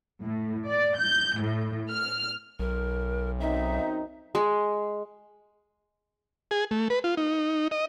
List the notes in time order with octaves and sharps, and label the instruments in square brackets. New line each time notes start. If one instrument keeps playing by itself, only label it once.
[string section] A2
D5
G6
A2
F6
[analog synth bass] B1 [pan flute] A#4
[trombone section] F#2 C4 D#4 [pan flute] E5
[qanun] G#3
[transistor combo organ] G#4
A3
B4
F4
D#4
D#5